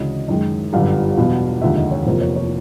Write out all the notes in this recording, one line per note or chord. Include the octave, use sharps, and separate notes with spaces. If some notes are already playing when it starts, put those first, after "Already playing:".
Already playing: D2 C#3 E3 G#3 D#5
F#2 D#3 G#3
G1 F#2 D3 G3 F5
E2 B2 F#3 B3
F1 D#2 D3 F3 G#3 E5
D#5
C#5
F1 E2 C3 F3 A#3 C5
C#5
C#5